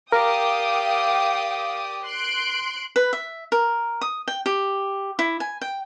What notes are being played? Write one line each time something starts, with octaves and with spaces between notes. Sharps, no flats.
G4 A#4 D5 F5 G5 D#6
C6 F#6 D7
B4
E5
A#4
D#6
G5
G4
E4
G#5
G5